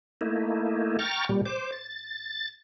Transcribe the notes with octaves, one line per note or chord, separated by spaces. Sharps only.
A3 A#3 D#4 E4
G5 A#5 C#6 F6 A6
A#2 G3
C5 D6
A6